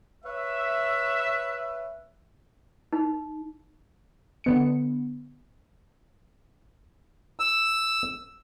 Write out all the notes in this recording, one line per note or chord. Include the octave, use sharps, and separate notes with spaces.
B4 C#5 E5
D#4
D3 B3 C#7
E6